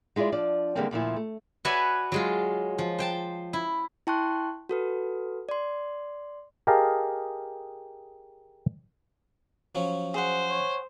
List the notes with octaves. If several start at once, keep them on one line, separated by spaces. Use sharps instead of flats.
G#3 E4 F4 B4 D5
F3 D4 D5
D3 E3 G3 G#3 A#3 C4
D2 A#2 F3 E4
A3
F#4 B4 C#5 D5 E5 G#5
F#3 G#3 F4
F3
C5 G5 A5
E4
E4 G5 A5 C6 C#6 F#6
F#4 A4 B4
D5 C6
G4 G#4 A#4 D#5 F5 A5
F3 F#3 C#4
G#4 C5 F#5
C#5